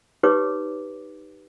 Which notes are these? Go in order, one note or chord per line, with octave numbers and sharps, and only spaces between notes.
D#4 G4 B4 C#5 D6